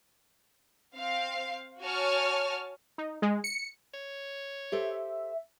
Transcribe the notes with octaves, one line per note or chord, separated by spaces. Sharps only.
C4 F5
F#4 C#5 G#5 A5 F6
D#4
G#3
C#7
C#5
G4 A4 C5 E5